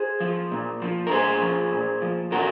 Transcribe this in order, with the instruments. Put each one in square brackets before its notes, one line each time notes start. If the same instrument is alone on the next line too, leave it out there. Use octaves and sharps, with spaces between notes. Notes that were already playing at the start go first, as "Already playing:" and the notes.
Already playing: [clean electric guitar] G#4 C5
F3
A#2
F3
A#4
A#2 G#4 C5
F3
A#2
F3
A#2 F#4 A#4